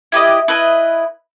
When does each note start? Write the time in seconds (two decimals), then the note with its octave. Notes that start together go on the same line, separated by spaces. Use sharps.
0.12 E4 G4 B4 D#5
0.48 E4 B4 D#5